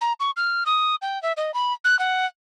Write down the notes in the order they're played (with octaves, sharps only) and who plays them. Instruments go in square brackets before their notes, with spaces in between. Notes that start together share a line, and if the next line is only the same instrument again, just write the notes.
[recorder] A#5
C#6
F6
D#6
G5
E5
D#5
B5
F#6
F#5